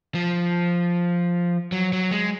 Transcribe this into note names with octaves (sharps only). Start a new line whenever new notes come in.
F3
F#3
F#3
G#3